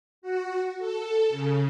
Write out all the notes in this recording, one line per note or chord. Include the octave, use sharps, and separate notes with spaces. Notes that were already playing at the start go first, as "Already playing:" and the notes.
F#4
A4
C#3